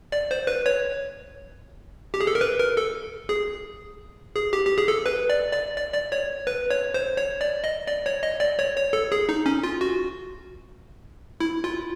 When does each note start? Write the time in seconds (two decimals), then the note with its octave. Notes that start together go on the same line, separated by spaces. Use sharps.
0.12 D5
0.31 C5
0.47 B4
0.66 C#5
2.14 G4
2.21 G#4
2.27 A4
2.35 A#4
2.41 B4
2.60 A#4
2.77 A4
3.29 G#4
4.35 G#4
4.53 G4
4.66 G4
4.78 G#4
4.88 A4
5.06 B4
5.30 D5
5.53 D5
5.77 D5
5.94 D5
6.12 C#5
6.47 B4
6.71 C#5
6.94 C5
7.17 C#5
7.41 D5
7.64 D#5
7.87 D5
8.06 C#5
8.23 D#5
8.40 D5
8.59 C#5
8.76 C#5
8.93 A4
9.12 G#4
9.29 D#4
9.46 C#4
9.63 F4
9.81 F#4
11.40 E4
11.64 F4